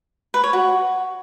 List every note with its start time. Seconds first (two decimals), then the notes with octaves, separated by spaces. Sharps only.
0.34 B4
0.44 C#5
0.53 F#4